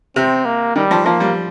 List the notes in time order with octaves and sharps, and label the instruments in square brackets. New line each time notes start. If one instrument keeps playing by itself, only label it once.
[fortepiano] C3 [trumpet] C4
[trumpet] A#3
[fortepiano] D#3 [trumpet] G3
[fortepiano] F3
[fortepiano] F3 [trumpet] A#3
[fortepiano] G3